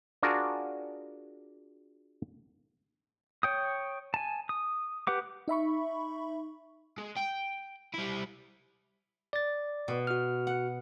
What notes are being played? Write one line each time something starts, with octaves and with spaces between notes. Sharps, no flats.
D4 F4 F#4 G#4 A#4
C#5 G5 D#6
G#5 A5
D#6
G4 B4 F#5 D6
D#4 E5 B5 C#6
G#3
G5
G3 E4
D5 A6
B2
F#4 F6
F#5